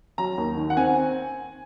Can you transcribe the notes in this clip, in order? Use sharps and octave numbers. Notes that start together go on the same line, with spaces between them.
F#3 A#5
D#2
D#3
F#5
C4 G#5